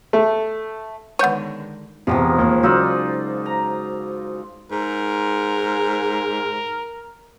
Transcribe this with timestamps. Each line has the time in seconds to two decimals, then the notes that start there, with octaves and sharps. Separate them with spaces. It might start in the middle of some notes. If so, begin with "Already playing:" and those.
0.13 A3
1.19 D3 D#3 G#3 B3 C#5 F#5 G6 D#7
2.07 E2 G#2 C3 D#3 F3
2.38 D#2
2.63 C#3 F#3 D#4 F4 D5 E6
3.46 A#5
4.71 G#2 A#4